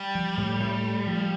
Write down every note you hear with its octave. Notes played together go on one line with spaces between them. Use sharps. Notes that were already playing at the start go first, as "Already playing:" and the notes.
Already playing: G3
F3
A2
A2
A3
F3